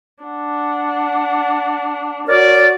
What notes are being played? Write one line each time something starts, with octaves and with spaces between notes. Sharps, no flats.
D4 F#5
F#4 A#4 C#5 D5